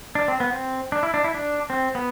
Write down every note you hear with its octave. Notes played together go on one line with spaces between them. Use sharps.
D4
C4
B3
C4
D4
E4
D4
E4
D4
C4
B3